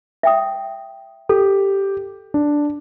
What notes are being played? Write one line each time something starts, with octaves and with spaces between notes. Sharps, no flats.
E5 G5 D#6
G4 A4
D4